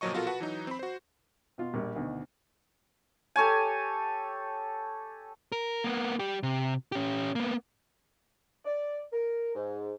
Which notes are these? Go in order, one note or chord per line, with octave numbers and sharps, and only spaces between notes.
G1 A#2 F3 F#3 D#5 C#6
B2 F4 F#4 A4 A#4
F#4 B4 F#5 A5
E3 F#3 D#4
C4 B5
F#4 C5
B2 F4
A#1 G3 A#3
D2 B2 D#3
G4 A4 C#5 G#5
A#4
A#3 B3
G3 G4
C3
C#4 G4
A#3 B3
D5
A#4
G#2